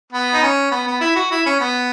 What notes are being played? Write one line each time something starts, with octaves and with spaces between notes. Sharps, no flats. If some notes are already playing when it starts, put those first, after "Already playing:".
B3
D#4
C#4
B3
B3
E4
F#4
E4
C#4
B3